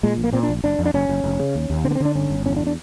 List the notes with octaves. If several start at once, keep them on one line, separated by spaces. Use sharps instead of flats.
A#2 G#3
A#1
A#3
A#2 C4
D4
A#1
F#1 D4
F2
D4
F#1 C#4
F#1
F1
C#3
D#2
D#2
D3 C4
B3
C4
D3 D4
G1 C#4
G1
E2 C#4
D4
D4